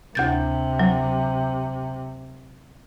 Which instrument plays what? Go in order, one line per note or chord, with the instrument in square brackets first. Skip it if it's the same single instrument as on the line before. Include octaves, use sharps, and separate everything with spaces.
[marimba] D2 G6 A6 [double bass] C3
[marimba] F#3